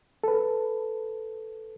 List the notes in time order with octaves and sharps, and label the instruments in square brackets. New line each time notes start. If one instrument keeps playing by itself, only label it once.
[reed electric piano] A4 B4